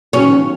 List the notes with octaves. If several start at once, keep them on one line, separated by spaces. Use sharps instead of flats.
F#3 C#4
D#3
F3